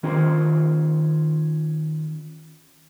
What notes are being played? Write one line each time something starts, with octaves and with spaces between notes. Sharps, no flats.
D#3 C#4 F4 G#4 C5